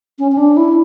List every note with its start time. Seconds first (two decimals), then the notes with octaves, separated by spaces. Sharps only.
0.19 C#4
0.32 C#4
0.37 D4
0.57 E4